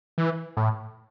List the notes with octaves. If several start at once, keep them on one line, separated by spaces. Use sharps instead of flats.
E3
A2